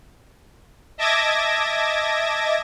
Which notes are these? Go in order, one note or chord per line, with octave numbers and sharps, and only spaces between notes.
D#5 E5 A5 D6 G#6 A#6